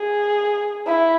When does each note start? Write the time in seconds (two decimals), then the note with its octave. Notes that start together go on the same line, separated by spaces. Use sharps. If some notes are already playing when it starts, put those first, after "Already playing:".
Already playing: G#4
0.86 E4